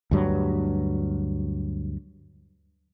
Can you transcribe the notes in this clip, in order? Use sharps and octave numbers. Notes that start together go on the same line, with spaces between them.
D2 G2 F#3